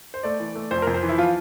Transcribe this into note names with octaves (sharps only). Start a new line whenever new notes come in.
C5
A3 D5
E3
A3
F2 C5
F2 A#4
C5
E3
E4
F3 F4